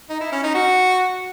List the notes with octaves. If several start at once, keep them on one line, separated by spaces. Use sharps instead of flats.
D#4
E4
C#4
D#4
F#4